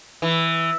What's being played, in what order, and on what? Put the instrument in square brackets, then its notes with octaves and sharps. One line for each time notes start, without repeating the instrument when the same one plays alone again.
[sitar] E3